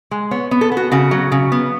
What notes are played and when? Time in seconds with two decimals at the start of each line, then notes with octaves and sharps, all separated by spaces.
0.11 G#3
0.31 B3 C#5
0.51 B3
0.61 A4
0.72 B3
0.77 F#4
0.92 C#3 F#4
1.11 F#3
1.32 C#3
1.52 B3